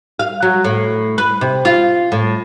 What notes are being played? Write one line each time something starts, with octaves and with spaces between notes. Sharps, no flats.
F5
F#3
A2
B4
C3
F4
A2